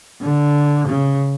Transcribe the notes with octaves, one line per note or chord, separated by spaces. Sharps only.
D3
C#3